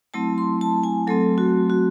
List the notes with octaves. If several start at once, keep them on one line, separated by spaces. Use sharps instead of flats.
F#3 A3 C4 E4 A5
C6
A5
G#5
F#3 A3 C4 A4
F#4
F#4